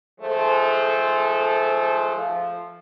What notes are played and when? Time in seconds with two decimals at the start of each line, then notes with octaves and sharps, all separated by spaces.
0.20 D#3 F3 G#3 A3 A4 C5
2.16 F3